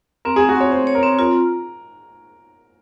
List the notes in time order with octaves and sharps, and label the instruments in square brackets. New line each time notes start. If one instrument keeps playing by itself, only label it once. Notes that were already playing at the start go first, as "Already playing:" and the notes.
[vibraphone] C4 [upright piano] A#4
[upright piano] G#4
[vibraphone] C4
[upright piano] F#4
[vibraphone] C4 [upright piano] C#5
[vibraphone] C4 [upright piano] C5
[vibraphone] C#5
[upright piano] A#4
[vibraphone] C4
[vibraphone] F4 [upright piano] A#4